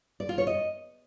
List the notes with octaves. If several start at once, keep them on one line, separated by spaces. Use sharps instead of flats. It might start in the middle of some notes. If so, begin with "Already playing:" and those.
D5
F4
C#5
D#5